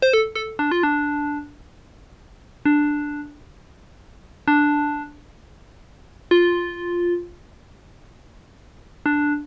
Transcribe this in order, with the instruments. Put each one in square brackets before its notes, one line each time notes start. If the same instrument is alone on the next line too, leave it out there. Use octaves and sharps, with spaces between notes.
[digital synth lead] C5
A4
A4
D4
F4
D4
D4
D4
F4
D4